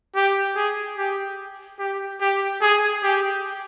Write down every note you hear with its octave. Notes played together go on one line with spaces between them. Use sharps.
G4
G#4
G4
G4
G4
G#4
G4